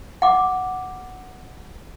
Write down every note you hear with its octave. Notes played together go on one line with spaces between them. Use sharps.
F#5 D6